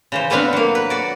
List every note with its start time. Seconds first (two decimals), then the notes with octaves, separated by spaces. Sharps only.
0.12 C#3 E3 C5
0.30 A2 B3 C4 D4 B4 F5
0.53 F#3 A#3
0.75 B4
0.90 F#4 D5